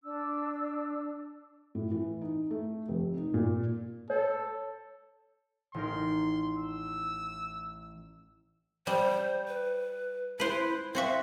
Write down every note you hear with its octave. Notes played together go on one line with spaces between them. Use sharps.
D4 E6
A2
E3
D#4
A3
F1
D#4
A#2
A4 C#5
A1 D#4 A#4 C6
E6
G3 C5
B4
E4 B4 C5
C4 F#4 E5 F5